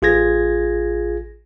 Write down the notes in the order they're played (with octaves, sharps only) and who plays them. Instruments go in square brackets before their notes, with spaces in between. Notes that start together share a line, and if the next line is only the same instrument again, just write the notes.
[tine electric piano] A1 F4 G#4 G#6 A#6